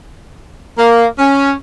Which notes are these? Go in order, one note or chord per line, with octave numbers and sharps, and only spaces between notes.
A#3
C#4